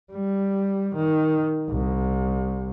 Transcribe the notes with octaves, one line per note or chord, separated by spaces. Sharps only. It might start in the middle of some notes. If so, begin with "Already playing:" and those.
G3
D#3
C2